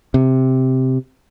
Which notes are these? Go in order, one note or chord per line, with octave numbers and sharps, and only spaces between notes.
C3